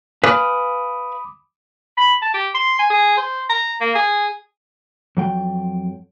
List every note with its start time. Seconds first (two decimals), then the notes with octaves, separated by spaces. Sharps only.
0.24 B4 F5 G#5 B5 D6 D#6
1.98 B5
2.22 A5
2.34 G4
2.55 C6
2.79 G#5
2.90 G#4
3.18 C5
3.49 A#5
3.81 A#3
3.95 G#4
5.17 F2 F#3 G5